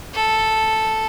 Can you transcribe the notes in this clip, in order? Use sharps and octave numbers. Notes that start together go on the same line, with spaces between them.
A4